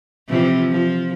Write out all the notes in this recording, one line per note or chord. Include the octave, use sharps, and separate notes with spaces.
C3 E3 F3
F3